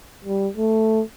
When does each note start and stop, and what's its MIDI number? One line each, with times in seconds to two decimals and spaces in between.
0.24 0.48 55
0.57 1.01 57